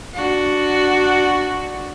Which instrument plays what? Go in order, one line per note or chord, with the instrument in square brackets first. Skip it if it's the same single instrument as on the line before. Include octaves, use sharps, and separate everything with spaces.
[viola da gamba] D4 F#4